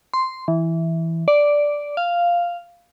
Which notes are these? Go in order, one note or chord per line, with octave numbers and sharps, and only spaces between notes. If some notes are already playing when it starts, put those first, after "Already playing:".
C6
E3
D5
F5